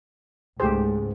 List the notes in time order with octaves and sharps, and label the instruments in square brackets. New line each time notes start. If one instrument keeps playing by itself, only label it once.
[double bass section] C#2 G#2 [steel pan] A3 G4 C5 [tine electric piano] G#4